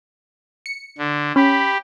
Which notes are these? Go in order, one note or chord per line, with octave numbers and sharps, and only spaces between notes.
C#7
D3
C#4 G4 B5